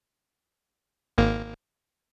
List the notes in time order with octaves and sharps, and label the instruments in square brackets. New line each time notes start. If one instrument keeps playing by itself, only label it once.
[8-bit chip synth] G#1 A#3